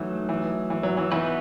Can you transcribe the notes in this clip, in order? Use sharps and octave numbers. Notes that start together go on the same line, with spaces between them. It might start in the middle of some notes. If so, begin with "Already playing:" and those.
Already playing: E3 F#3 A3 D#4
E3
E3
F#3
E3
E3 B3 D#4 F#4 B4